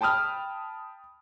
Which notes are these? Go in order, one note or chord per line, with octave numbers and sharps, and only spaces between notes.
G5 A5 B5 D#6 F6